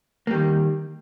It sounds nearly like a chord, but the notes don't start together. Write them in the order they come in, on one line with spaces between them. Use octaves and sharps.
A#3 G3 D#3